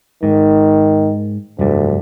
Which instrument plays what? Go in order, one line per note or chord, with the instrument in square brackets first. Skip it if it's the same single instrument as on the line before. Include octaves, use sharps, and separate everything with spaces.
[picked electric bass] G#2 [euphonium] D#3
[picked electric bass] F1 G2 G3 [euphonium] D2